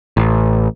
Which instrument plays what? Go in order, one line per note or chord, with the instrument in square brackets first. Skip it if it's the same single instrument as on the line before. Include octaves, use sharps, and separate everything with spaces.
[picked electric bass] A1